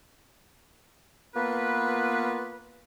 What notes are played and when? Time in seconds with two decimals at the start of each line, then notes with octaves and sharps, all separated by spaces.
1.35 A#3 B3 F4 B4